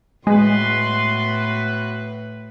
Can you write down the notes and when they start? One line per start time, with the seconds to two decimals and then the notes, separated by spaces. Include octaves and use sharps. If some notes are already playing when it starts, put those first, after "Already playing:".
0.27 A2 G#3 B3 F#4 B4 C6